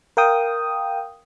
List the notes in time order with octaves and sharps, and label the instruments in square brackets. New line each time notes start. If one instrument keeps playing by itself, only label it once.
[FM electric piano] A#4 F5 G5 D#6